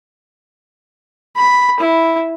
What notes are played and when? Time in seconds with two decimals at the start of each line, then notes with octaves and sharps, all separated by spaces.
1.36 B5
1.80 E4